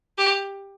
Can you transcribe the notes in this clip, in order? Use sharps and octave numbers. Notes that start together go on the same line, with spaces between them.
G4